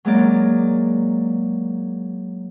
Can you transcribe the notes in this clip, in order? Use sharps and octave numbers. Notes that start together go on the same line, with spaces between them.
F#3 G#3 A#3 D5